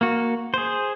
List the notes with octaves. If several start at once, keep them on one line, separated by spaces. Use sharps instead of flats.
A#3 F#4
G#4 C5